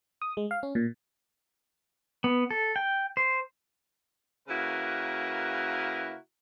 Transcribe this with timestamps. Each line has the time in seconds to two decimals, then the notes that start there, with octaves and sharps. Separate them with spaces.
0.22 D#6
0.37 G#3
0.51 F5
0.63 C#4
0.75 A#2
2.24 B3
2.51 A4
2.76 G5
3.17 C5
4.49 C#3 A#3 E4 F#4 A#4 B4